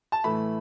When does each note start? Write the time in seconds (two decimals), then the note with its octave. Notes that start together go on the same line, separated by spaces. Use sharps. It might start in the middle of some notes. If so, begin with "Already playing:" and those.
0.12 A5
0.24 A2 E3 A3 B5